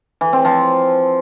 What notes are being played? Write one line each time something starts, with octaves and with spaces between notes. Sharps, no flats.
E3
C4
F3